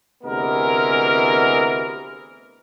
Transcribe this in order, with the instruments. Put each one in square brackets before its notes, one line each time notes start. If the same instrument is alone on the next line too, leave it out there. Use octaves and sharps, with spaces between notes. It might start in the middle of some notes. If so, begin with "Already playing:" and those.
[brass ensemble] D2 C3 E3 G#3 B3 A#4